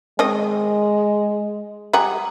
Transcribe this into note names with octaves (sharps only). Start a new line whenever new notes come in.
D#3 G#3 C4 D#5
G3 G#4 F#5 A#5